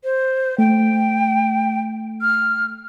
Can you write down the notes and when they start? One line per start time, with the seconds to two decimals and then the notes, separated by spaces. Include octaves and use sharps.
0.04 C5
0.58 A3 G5
2.22 F6